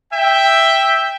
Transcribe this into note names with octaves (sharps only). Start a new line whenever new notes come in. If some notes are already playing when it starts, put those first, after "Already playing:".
E5 G5